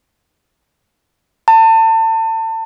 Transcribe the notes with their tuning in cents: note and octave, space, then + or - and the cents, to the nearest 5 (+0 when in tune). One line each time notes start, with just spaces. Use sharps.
A5 +30